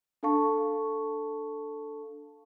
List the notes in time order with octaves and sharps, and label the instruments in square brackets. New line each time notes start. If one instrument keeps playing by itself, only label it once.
[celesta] D4 A4 F5 A5 C#6